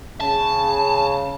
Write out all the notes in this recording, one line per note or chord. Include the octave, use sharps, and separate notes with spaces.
C#3 A5